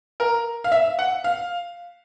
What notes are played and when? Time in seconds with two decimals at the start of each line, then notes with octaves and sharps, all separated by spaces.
0.20 A#4
0.64 F5
0.72 E5
0.99 F#5
1.24 F5